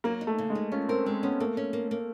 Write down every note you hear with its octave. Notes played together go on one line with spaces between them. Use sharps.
F#3 A#3
D#4
A3
C#3
G#3
D#4
C#4 F4
C4 A#4
G#3 C4
B3 C#4
A3 A#3
C#4
A#3
A#3